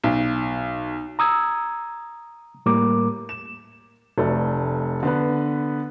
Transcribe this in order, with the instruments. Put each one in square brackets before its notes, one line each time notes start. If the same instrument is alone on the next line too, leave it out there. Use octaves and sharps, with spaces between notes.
[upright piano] B1
[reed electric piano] A#5 D#6 E6 G#6
A2 G3 A#3 A#4 D6
[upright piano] E7
F1 A3 B4 D5
D3 B3 B4